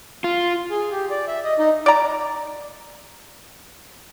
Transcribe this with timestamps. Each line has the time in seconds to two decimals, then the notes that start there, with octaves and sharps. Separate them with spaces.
0.24 F4
0.70 G#4
0.91 G4
1.11 D5
1.27 E5
1.44 D#5
1.59 D#4
1.86 D5 A#5